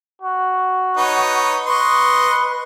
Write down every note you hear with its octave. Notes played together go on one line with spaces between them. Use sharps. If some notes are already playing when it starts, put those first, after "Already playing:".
F#4
D#4 B4 C#5
B4 D#5 C6 C#6